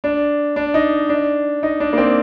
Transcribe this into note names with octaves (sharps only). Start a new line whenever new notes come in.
D4
D4
D#4
D4
D#4
D4
A#3
C4